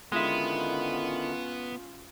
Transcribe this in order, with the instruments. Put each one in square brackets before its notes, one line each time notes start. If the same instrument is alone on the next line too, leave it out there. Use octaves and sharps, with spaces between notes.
[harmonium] D3 D#3 E4 [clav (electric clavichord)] G#3 E5 [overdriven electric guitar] B3 [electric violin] C#4 F4